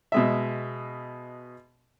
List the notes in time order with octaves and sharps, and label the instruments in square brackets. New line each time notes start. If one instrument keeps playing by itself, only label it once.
[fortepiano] B2 G#3 E5